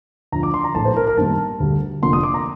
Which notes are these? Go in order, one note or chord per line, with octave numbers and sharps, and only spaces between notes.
D2 D3 F3 A#5
D6
C6
A#5
A#1 A2 A3 A5
C5
A#4
A#4
G2 D#3 G3 A#3 A5
D2 D3 G3
F1 F2 D3 F3 A#3 C6
D#6
D6
A#5